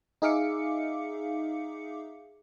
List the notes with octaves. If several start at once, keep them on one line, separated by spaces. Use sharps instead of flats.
D#4 G#4 E5 F5 D6 C#7